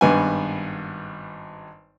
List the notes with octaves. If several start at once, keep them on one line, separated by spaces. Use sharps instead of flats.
G#1 G2 B3 G#5